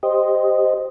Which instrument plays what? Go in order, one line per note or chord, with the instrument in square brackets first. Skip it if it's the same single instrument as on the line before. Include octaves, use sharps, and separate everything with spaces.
[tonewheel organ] G4 C5 D#5